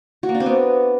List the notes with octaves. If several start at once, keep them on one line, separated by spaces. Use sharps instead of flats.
F#4
A#3
D4
C4
B3